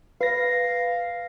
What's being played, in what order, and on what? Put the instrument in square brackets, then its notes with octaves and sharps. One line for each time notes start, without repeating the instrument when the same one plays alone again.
[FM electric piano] B4 A#6 [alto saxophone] F5